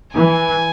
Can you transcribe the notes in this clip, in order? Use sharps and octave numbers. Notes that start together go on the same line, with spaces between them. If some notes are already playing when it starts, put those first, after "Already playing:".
E3 G#5